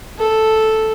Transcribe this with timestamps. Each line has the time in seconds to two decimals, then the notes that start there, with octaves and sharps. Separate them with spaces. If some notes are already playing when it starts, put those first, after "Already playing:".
0.19 A4